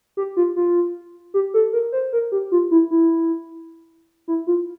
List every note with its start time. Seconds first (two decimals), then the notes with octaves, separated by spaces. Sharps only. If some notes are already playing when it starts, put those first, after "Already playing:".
0.17 G4
0.37 F4
0.56 F4
1.34 G4
1.54 A4
1.73 A#4
1.92 C5
2.13 A#4
2.32 G4
2.52 F4
2.71 E4
2.91 E4
4.28 E4
4.47 F4